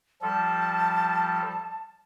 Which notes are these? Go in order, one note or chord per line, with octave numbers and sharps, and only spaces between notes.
F3 G3 A4 A5